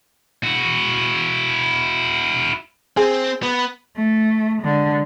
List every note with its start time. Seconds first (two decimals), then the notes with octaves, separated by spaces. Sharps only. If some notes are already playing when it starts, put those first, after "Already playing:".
0.43 E4 F#4
2.97 C4 G#4 G#5
3.43 B3
3.97 A3
4.62 D3 G#3